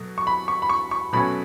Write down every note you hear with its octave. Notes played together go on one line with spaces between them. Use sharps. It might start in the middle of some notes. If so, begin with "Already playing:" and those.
Already playing: B2 F#3 A3
C#6
B5
C#6
B5
C#6
C#6
B2 F#3 A3 C#4 B5